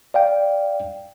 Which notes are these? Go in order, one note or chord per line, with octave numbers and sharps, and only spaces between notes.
D5 F5 G5